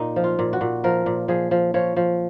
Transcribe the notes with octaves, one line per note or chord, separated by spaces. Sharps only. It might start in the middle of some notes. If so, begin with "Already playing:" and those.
Already playing: A#2 D#4
F3
F4
A#2
F#4
A#2
F3 A#4
A#2
F3 G#4
F3
F3 C#5
F3